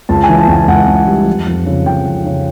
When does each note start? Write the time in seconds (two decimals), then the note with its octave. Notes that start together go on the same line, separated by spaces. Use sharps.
0.09 C#2 A5
0.24 G#5
0.29 E3
0.38 A5
0.48 C#2 G#5
0.68 C#2 F#5
0.87 C#2
1.07 G3
1.27 F2
1.47 F2
1.66 C#3
1.86 F2 G5
2.06 F2
2.25 C#3